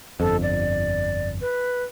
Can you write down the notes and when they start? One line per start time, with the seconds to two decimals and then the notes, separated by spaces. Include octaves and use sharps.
0.20 G1 F2 A4
0.42 D5
1.41 B4